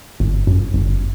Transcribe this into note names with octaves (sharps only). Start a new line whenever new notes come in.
G1
F#2
G1